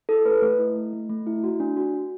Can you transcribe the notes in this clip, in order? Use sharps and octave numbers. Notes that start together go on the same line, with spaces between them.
E4 A4
A3 B4
A3
E4
A3
A3
A3
E4
F#4
D4
F#4
F#4